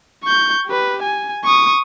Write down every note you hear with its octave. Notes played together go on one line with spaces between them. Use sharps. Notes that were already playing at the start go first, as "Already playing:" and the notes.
C#6 G6
G4 B4
G#5
C#6 D#6